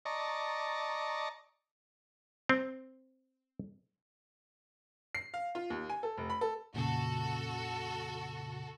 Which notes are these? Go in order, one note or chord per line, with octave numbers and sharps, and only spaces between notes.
D5 D#5 A5 A#5 C#6
C4
C7
F5
F4
D#2
G#5
A4
F1
B5
A4
F2 A#2 C#3 F#4 A4